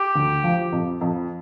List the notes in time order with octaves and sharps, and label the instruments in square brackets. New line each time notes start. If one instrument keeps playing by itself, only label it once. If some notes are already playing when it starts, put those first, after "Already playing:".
Already playing: [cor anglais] G4
[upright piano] D2
F3
F2
F2